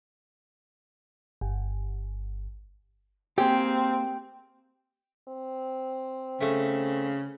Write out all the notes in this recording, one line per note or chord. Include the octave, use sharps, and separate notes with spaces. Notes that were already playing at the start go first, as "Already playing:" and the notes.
G1
A#3 C4 G4 G#4 G5
C4
C#3 A3